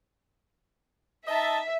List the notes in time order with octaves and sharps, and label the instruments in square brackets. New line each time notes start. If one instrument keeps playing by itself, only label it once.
[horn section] D#4 D#5 A5 [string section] E5